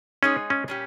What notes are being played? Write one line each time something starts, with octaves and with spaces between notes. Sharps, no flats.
G#3 C#4 D#4 G#4 C#5
C#4
A#2 G3 C#4 G4